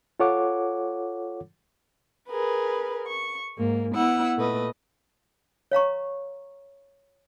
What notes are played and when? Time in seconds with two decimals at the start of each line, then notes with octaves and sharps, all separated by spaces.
0.20 F4 A4 C#5 F#5 D6
2.29 G#4 A#4 B4
3.06 C#6
3.57 G#2 A#3
3.95 B3 E4 F#5 E6
4.36 A#2 A3 B4 D#5
5.71 C#5 F5 A#5 C#6